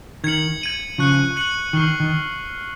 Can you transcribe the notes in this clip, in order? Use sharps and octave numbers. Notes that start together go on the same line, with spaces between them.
D#3 G#6 C#7 F#7
G#6 D#7 F#7
C#3 F3 C#6 F#6 C#7 F#7
F#6 C#7 F#7
D#3 C#6 F6 C7 F#7
D#3